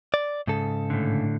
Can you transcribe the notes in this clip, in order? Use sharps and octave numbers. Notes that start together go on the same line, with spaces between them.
D5
G#2 C#3 A4
A2 D3